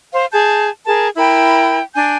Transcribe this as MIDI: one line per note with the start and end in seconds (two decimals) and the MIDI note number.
0.13 0.27 72
0.13 0.27 77
0.32 0.68 68
0.32 0.68 81
0.32 0.68 91
0.85 1.08 68
0.85 1.08 70
0.85 1.08 81
1.16 1.79 64
1.16 1.79 70
1.16 1.79 79
1.16 1.79 83
1.95 2.16 62
1.95 2.16 80
1.95 2.16 91